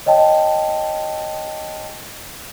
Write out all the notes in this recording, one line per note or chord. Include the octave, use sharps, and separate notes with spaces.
C#5 D#5 G5 A5